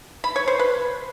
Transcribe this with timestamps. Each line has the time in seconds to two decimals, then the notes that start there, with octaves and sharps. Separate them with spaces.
0.24 B5
0.36 C#5
0.48 C5
0.59 B4